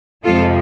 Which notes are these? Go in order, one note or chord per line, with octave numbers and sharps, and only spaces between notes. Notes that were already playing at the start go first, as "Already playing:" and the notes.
F2 C3 F3 G#3 F4 A4